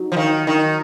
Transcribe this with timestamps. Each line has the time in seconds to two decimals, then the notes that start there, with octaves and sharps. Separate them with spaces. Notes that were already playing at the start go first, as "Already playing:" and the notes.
Already playing: F#3 D#4
0.12 F3
0.17 D#3
0.47 D#3